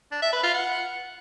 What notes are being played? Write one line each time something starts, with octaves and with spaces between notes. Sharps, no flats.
D4
E5
B4
F4
F#5